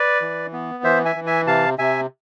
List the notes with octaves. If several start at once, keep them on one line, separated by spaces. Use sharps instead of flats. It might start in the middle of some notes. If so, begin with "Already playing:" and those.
Already playing: B4 D5
E3
B3
E3 C5 E5
E5 G#5
E3
E5 G#5
C3 F5 A5
C3 E5 G#5